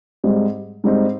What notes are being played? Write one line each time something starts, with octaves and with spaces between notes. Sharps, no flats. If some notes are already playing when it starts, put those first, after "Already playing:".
G#2 G3 C4 D#4
G#2 G3 C4 D#4